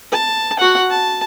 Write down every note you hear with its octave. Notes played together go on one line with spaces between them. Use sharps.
A5
F#4 F#5
A5